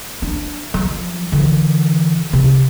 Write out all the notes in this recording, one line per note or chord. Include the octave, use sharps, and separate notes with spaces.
D4
F3
D3 E3
C3